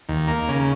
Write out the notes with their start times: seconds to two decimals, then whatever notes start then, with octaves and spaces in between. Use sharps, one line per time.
0.09 D#2
0.28 A#3
0.49 C#3